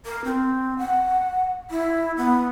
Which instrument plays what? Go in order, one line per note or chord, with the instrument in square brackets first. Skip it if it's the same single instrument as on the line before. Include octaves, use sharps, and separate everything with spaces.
[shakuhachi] A#4
C4
F#5
E4
B3